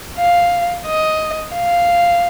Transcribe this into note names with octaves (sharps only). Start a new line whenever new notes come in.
F5
D#5
F5